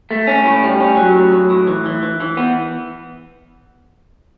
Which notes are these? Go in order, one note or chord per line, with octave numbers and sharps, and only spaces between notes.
A3
C#4
A2
G3
C#4
F#3
A2
F#3
A2
E3
E3
E3
E3
B3